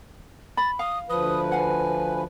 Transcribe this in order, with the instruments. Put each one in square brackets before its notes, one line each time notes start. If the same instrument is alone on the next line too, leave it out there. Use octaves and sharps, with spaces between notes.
[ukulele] B5 [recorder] A6
[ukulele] F5 [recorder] D#6
[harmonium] D2 F3 B4 [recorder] D#6
[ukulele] F5 F#5 [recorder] G#5